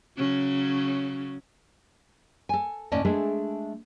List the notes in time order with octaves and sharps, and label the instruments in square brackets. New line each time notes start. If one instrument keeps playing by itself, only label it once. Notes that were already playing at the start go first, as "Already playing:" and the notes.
[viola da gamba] C#3 F#3 C#4
[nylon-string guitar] A4 G#5
D#2 A2 C#4 D5 D#5 A5
G#3 A3 D4 G#4 A4 E5